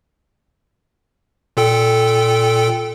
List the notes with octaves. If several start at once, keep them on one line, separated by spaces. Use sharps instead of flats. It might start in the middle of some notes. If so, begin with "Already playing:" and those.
A#2 A4 G5